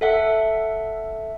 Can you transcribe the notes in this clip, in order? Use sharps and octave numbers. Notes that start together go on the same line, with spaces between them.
A4 E5 F#5